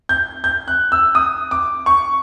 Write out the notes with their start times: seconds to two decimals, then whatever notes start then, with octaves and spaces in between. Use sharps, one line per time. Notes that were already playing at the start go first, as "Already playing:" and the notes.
0.09 G6
0.44 G6
0.68 F#6
0.92 E6
1.15 D#6
1.51 D6
1.86 C#6